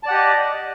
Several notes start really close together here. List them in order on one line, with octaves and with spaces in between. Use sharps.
A5 D5 F#5 G4 D#5